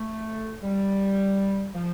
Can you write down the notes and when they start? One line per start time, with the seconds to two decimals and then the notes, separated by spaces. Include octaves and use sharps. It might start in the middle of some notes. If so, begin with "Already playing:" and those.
Already playing: A3
0.63 G3
1.74 F3